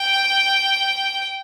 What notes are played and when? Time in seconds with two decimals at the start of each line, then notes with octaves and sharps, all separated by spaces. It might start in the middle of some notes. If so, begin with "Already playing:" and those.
Already playing: G5